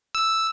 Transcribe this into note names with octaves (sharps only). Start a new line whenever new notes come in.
E6